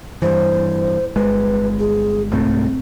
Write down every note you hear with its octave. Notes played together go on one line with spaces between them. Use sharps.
G2 E3 C5
G1 G#3 B4
G#4
C2 G#2 A3 C4